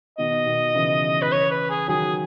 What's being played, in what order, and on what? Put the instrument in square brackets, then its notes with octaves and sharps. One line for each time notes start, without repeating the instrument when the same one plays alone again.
[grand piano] B2 D#3 [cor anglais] D#5
[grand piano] B2 D#3
C#3 E3
[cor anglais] B4
C#5
B4
G#4
[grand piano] D#3 F#3 [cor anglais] G#4